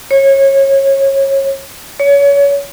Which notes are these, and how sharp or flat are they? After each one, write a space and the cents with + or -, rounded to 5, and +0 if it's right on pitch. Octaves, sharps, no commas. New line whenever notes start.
C#5 -25
C#5 +30